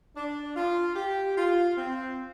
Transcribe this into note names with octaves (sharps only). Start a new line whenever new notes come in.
D4
F4
G4
F4
C4